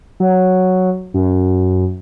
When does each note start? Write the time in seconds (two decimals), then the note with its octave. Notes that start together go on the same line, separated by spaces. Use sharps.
0.20 F#3
1.14 F#2